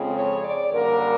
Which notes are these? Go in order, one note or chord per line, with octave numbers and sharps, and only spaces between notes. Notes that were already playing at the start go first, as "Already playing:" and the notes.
Already playing: F2 C#3 F3 G#3 C4
C#5
D5
F#2 D3 G3 A#3 A#4